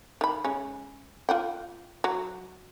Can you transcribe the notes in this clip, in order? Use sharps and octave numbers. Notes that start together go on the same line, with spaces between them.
D#3 B5
G#3 C#4
F4 F#5 G5
F#3